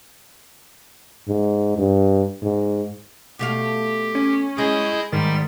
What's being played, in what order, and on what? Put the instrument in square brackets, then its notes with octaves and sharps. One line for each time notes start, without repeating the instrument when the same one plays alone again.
[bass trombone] G#2
G2
G#2
[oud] B2 A3 F5 [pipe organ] G4
[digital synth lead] C#4
[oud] G#3 [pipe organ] E4 D#5 G6 [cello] G#4
[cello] G#2 [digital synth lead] D#3 [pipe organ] G3 A6